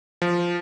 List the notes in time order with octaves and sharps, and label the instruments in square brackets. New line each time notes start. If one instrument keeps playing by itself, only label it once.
[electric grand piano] F3